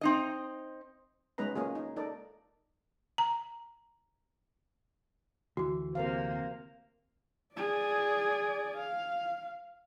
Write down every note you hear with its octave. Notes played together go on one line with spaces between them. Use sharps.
C4 D#4 D#5
G#3 B3 C#4 D#4 B4 A#5
A#3 C#4 F4 G#4
D#4
D#4 A4 A#4 D5
A#5
D2 E3 F#4
C3 A#3 A#4 C5 F5
G#4 D5
F5